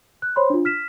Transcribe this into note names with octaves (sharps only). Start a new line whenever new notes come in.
F#6
C5 C#5 B5 C6
D4 F4
F6 B6 E7